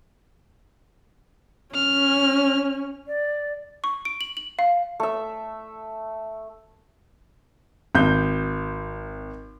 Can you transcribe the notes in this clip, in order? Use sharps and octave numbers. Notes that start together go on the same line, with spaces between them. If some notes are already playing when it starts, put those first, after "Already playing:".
C#4 F6
D5
C#6
D7
F#7
F#7
F5
A3 E5
G#1 G6